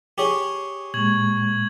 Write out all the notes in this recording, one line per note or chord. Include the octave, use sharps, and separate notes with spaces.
G4 G#4 C#5
A#2 G#3 C#6 G#6 F#7